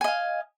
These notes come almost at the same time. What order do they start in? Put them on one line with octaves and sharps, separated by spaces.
G#5 D#5 F5